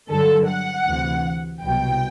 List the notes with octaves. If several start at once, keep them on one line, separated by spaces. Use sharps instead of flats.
G2 D3 F#3 A4
F#5
D2 C3 E3
C2 B2 F#3 G5